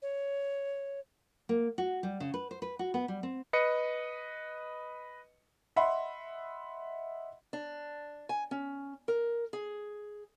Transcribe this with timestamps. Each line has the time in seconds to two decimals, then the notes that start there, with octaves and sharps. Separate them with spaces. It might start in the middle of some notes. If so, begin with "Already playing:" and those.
0.02 C#5
1.49 A#3
1.78 F#4
2.03 G3
2.20 C#3
2.34 B4
2.51 C5
2.62 B4
2.79 F#4
2.94 B3
3.08 G3
3.23 C4
3.53 B4 D#5 C#7
5.76 D#5 E5 F#5 B5 C6
7.53 D4
8.29 G#5
8.51 C#4
9.08 A#4
9.53 G#4